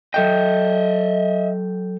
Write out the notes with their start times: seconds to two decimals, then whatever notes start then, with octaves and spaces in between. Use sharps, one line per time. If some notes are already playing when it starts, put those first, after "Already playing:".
0.14 F#3 A4 D#5 E5 G5